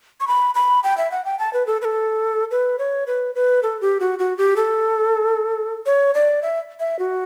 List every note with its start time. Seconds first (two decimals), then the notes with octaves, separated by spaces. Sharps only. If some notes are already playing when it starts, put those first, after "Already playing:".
0.20 C#6
0.27 B5
0.55 B5
0.84 G5
0.98 E5
1.12 F#5
1.25 G5
1.39 A5
1.53 B4
1.67 A4
1.82 B4
1.85 A4
2.51 B4
2.79 C#5
3.07 B4
3.35 B4
3.63 A4
3.81 G4
4.00 F#4
4.19 F#4
4.38 G4
4.57 A4
5.86 C#5
6.14 D5
6.43 E5
6.80 E5
6.99 F#4